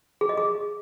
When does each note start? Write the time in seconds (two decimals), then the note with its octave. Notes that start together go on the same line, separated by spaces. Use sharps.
0.21 G#4
0.29 D#5
0.38 G#4